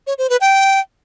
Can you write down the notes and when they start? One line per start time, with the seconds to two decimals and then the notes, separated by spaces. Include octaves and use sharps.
0.07 C#5
0.18 C5
0.29 B4
0.41 G5